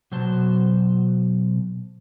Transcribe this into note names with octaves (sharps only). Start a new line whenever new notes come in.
B2 F#3 C5 A5